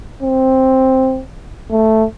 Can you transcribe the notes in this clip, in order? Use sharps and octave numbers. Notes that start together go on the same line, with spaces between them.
C4
A3